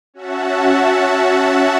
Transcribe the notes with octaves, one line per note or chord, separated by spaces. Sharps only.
C#4 F#4 E5 F#5 A5